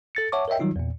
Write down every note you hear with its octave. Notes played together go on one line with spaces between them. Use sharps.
A4 A6 C#7
C#5 E5 F#5 A5 C#6 D6
A#4 C#5 D#5 E5 G5
D#3 F#3 G3 D#4 F4
E2 A#2